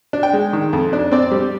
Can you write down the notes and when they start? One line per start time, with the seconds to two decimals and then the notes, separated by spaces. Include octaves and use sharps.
0.13 D4
0.23 G5
0.33 G#3
0.53 D#3
0.73 F2
0.93 D4
1.11 C4 D5
1.32 G3